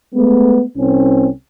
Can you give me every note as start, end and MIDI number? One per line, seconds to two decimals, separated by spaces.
0.15 0.62 56
0.15 0.62 57
0.15 0.62 59
0.78 1.28 36
0.78 1.28 60
0.78 1.28 61